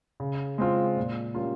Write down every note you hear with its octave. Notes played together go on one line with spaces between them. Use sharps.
C#3
G#3 C4 F4
A#2
G3 A#3 C#4 F4